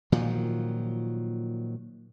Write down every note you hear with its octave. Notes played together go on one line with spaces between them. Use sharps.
A#2 D#3 F3 F#3